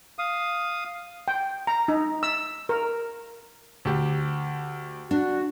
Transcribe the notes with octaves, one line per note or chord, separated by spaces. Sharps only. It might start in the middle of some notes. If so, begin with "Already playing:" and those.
F5 D#6
G5
A#5
D#4
E6
A#4
D2 G4
D4 F#4